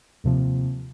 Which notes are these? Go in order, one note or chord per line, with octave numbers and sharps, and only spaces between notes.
D#2 C3 F3